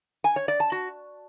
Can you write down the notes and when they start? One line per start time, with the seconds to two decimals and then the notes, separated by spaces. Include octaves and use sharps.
0.24 G#5
0.36 C#5
0.48 D5
0.60 A5
0.72 F#4